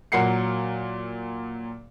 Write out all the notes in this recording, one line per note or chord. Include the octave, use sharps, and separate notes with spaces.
A#2 F#3 A#3 F#5 C7 C#7